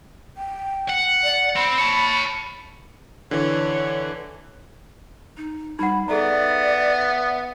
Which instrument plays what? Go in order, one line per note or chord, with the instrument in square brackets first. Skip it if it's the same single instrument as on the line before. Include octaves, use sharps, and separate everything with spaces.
[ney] G5
[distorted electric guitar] F#5
[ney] D5
[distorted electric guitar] C4 [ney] B5
[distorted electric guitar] C#5 A5
[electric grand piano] D3 E3 [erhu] C#5
[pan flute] D#4
[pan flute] G3 [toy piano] D#4 F#5 [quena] B5
[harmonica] B3 [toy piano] G#4 A4 A#5 [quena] D5 [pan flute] E5